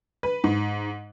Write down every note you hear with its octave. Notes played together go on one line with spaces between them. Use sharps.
B4
G#2